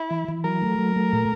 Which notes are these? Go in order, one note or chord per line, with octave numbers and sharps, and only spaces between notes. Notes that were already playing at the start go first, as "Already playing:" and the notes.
Already playing: E4
E3
E3
F#3 A#4
A3
F#3
A3
A#2